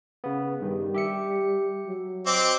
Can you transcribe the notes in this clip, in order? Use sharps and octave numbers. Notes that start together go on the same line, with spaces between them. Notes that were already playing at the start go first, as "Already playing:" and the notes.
C#3 B3
G2 D#3 G3
G4 E5 C#7
F#3
C4 D#5 D6